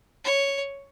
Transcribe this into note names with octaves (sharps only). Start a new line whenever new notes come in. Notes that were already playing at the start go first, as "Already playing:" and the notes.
C#5